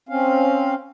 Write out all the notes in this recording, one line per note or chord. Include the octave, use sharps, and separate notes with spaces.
C4 C#4 F5